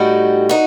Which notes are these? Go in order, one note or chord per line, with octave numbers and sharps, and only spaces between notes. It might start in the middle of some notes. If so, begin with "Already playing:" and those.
Already playing: A2 G3 D#4 F#4
D#4 F#4